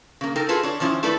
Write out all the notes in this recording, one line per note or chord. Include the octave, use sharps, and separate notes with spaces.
C#3 A#3
D#4 A4 A#4 G5
F4 G#4 A4 B4
D4 C#5
D#3 F3 C#4 E4
A3 E4 A4 B4 D5